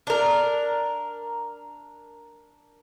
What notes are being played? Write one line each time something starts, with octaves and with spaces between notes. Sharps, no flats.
D4 A#4